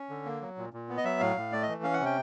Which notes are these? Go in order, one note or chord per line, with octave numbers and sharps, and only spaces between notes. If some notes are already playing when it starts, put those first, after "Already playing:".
Already playing: C#4
D3
A#3
F#3
A#2
A#2
B3
D#5
F#3 E5
A2 F5
A2
A3 D5
D#5
E3
C#4 F5
F#5
C3
G5